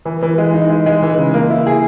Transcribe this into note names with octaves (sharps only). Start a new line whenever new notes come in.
E3
E3
G#3
D#4
G#3
G#3
E3
C#3
A#3
E4
G#4